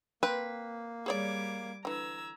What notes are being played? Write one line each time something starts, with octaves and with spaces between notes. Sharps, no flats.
A#3 C4 B4
G3 G#4 C#5 D5 D6 G#6
D3 E3 A#5 E6 G#6